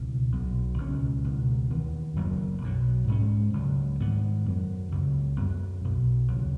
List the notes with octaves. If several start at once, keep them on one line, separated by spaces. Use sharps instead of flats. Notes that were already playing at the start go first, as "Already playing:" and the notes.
Already playing: C#2 B2 B3
B1 B2 F#3 B3
C#2 B2 G#3 C#4
C#2 B2 B3
D#2 D#3 B3
F#1 F#2 F#3 B3
B1 B2 F#3
G#2 G#3 C#4
C#2 C#3 F#3
G#2 D#3 B3
F#2 F#3 B3
C#2 C#3 F#3
F#2 F#3 B3
B1 B2 B3
D#2 C#3 F#3